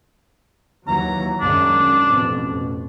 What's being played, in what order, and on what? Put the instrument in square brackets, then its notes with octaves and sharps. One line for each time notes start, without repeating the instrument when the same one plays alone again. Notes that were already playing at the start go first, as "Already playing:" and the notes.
[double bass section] D#2 E3 F#3 [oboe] A#5
[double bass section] F#2 D#3 G#3 [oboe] D4
[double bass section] A1 F2 B2